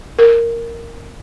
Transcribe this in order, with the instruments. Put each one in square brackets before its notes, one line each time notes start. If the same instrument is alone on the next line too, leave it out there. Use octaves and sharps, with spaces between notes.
[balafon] A#4